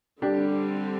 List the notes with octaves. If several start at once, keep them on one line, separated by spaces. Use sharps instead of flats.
D3 G3 C4 D4 G4